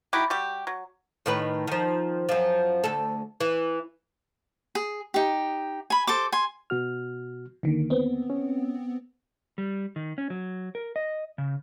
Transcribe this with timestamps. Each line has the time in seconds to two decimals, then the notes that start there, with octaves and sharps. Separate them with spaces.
0.13 D#4 E4 F#4 G4
0.30 G3 F#4 G4
0.67 F#3
1.26 A2 D#3 B4
1.67 D#3 F3
2.29 F#2 F3
2.84 D2 A4
3.40 E3
4.75 G#4
5.14 D#4 G4
5.90 G#5 B5
6.07 A4 C5 D6
6.32 G#5 C6
6.70 B2 F#4 F6
7.63 D#2 D3 D#3 A#3
7.90 B3 C4
8.30 C#4
9.58 G3
9.96 D#3
10.18 C#4
10.30 F#3
10.75 A#4
10.96 D#5
11.38 C#3